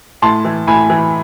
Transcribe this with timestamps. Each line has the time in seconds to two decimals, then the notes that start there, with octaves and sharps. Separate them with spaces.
0.22 A2 A5 C6
0.45 E3
0.67 A2 G#5 B5
0.90 E3